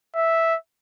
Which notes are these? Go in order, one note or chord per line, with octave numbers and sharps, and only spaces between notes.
E5